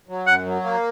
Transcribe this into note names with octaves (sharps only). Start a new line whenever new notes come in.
F#3
F#2 F#5
F#3
A#3